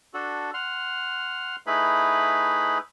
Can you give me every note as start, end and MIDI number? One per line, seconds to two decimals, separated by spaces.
0.14 0.51 62
0.14 0.51 66
0.14 0.51 69
0.54 1.56 78
0.54 1.56 84
0.54 1.56 89
1.67 2.78 57
1.67 2.78 63
1.67 2.78 64
1.67 2.78 68
1.67 2.78 71
1.67 2.78 83